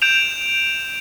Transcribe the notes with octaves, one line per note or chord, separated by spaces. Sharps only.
G6 D7 E7 F7